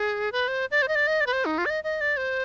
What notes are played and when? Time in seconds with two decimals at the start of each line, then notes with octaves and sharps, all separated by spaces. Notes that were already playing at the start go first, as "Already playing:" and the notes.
Already playing: G#4
0.32 B4
0.48 C5
0.71 D5
0.82 C5
0.88 D#5
0.95 D5
1.07 D#5
1.21 D5
1.27 B4
1.33 C5
1.45 D#4
1.58 F4
1.66 D5
1.70 D#5
1.84 D#5
2.01 D5
2.17 C5